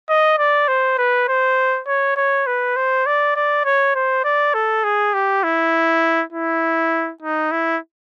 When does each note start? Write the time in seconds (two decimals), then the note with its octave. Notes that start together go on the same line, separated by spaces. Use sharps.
0.09 D#5
0.38 D5
0.68 C5
0.98 B4
1.28 C5
1.87 C#5
2.17 C#5
2.46 B4
2.76 C5
3.06 D5
3.36 D5
3.65 C#5
3.95 C5
4.24 D5
4.54 A4
4.84 G#4
5.14 G4
5.44 E4
6.33 E4
7.22 D#4
7.52 E4